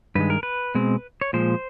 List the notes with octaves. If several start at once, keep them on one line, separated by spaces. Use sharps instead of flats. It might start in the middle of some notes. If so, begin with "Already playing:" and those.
G2 D#3 G#3 B4
A#4
B4
B2 G#3 C4
C#5
A#2 F3 G#3 C5